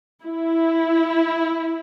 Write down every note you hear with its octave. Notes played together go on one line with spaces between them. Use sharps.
E4